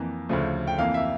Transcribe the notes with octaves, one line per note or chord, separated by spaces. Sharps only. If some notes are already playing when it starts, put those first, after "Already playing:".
Already playing: F2 E3 A#3
D2 C#3 F3 A3
G5
F2 E3 A#3 F5
E5